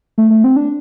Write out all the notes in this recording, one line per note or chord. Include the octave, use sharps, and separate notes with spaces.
A3
A3
C4
D4